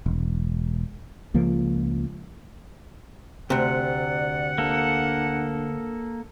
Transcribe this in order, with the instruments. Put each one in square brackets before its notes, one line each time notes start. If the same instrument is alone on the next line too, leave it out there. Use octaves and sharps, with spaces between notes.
[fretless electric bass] E1
C#2 F3 A#3
[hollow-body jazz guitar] D2 C3 [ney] D5 [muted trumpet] F#5
[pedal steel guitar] A#3 A4 [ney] D4